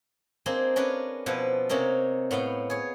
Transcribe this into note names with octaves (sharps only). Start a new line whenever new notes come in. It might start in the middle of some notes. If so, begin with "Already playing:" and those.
A#3 C4 D4 D#4 G#4
C#4 D4 A#4 B4
B2 F3 E4 B4
C3 A#3 C#4 D#4 A#4
A2 B3 F5 G5
G#4 C#5